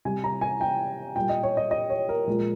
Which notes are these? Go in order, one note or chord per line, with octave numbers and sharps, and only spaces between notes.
C3 G3 G#5
A#5
G#5
G5
A#2 G3 G5
D#5
C#5
D#5
D#5
C#5
A#4
A#2 F3 G#3